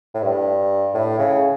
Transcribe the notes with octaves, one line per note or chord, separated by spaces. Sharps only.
A2
G2
A2
C#3